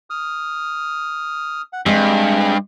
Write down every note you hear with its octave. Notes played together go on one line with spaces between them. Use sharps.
D#6 F6
F#5
G2 G#3 C4 G#5